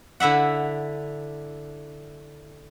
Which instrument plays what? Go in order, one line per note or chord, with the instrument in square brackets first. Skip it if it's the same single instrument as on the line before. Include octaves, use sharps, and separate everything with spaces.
[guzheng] D3 E4 E5 F#5